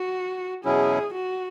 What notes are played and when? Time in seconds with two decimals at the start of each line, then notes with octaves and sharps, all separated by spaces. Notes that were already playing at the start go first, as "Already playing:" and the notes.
Already playing: F#4
0.64 E2 B2 F#3 C#4 E4 G#4
1.14 F#4